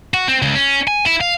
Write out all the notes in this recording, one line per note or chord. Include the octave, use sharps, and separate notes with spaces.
F#4
C4
C#2
C#4
G#5
E4
F5